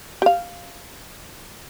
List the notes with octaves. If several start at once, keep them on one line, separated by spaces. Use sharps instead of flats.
G4 F5